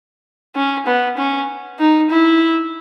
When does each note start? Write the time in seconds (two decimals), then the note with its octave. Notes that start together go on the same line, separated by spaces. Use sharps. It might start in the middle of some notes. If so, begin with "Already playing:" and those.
0.56 C#4
0.86 B3
1.17 C#4
1.79 D#4
2.10 E4